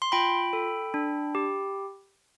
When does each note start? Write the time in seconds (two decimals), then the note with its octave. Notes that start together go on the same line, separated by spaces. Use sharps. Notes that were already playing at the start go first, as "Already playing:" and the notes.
0.02 C6
0.12 F4 G5 B5
0.53 A4
0.94 D4
1.35 G4